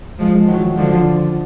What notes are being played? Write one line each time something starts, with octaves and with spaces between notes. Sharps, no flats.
F3 G#3
D#3 F#3
D3 F3